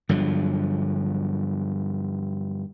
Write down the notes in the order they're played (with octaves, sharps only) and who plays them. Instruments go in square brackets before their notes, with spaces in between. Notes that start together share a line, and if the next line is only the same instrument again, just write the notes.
[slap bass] G2 D3 F3 F#3